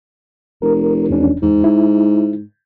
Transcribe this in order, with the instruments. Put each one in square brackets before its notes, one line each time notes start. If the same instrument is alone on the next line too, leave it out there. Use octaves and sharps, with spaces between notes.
[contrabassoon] F1 [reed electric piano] A#4
[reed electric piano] E2 C#4 D4
[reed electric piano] E2 [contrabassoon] G#2
[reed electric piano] E4